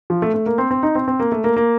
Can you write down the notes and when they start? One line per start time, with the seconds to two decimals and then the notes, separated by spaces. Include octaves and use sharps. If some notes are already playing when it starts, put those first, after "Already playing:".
0.10 F3
0.22 A3
0.34 A3
0.46 A#3
0.58 C4
0.71 C4
0.83 D#4
0.95 C4
1.08 C4
1.20 A#3
1.32 A3
1.44 A#3
1.56 A#3